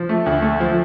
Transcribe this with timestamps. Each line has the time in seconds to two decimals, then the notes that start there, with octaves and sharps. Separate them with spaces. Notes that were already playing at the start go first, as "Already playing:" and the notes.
Already playing: F3
0.09 A3
0.26 D2
0.42 A3
0.60 F3